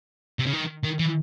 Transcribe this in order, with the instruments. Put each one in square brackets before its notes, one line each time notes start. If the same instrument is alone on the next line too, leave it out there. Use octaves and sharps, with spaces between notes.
[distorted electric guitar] C3
C#3
D#3
D#3
E3